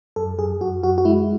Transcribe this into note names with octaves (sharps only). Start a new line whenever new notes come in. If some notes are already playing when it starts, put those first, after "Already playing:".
F#2 A4
F#2 G#4
F#2 F#4
F#2 F#4
F#4
G#3 E4